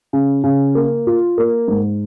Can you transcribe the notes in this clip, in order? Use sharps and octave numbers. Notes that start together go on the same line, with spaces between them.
C#3
C#3
A#3
F4
A#3
G#2